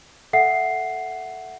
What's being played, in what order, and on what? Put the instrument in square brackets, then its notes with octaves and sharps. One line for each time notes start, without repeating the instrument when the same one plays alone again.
[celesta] A4 E5 F#5 C7